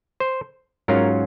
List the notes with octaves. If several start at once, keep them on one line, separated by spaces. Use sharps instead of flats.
C5
G#2 F#3 C#4 F4 A#4